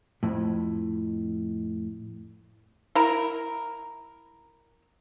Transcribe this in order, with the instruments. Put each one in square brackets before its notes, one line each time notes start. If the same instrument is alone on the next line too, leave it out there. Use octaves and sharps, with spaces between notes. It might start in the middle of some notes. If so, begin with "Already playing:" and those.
[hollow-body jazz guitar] F2 A2
[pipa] E4 A#4